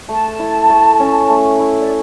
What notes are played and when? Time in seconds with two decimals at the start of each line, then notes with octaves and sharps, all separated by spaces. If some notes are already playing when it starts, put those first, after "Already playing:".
0.09 A3 A5
0.39 E4
0.70 A3
1.00 C#4
1.29 A3
1.59 E4
1.81 D5